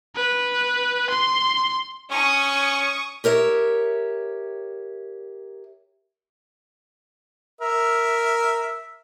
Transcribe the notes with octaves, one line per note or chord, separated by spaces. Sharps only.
B4
C6
C#4 C#6 D#6
G4 A#4 C#5 E5
A#4 E5